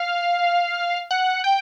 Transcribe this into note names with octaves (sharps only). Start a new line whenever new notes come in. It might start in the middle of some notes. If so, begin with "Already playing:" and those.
Already playing: F5
F#5
G5